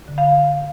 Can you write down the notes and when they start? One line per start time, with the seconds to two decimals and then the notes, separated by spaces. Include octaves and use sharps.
0.08 D3
0.18 F5